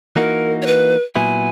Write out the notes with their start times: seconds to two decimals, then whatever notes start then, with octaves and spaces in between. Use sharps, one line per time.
0.16 E3 A#3 D#4 F#4 A#4
0.62 C#5
0.67 B4
1.15 A#2 F#3 B3 E4 G#5